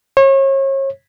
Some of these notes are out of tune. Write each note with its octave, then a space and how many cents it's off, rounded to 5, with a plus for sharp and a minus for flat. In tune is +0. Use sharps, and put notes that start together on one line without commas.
C#5 -35